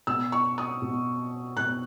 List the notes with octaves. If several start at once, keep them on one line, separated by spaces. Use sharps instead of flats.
B2 E6
C#6
D#6
B2
B2 F#6